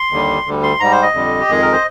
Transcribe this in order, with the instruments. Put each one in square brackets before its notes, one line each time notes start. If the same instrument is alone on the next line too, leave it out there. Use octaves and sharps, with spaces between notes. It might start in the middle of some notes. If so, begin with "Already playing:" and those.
Already playing: [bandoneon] C6
D#2 D3 G3
D2 D3 G3
C6
G#2 G3 A#5
C5
D#5
F2 D3 G3
G4
F2 D#3 G#3 G#4
A#4
C5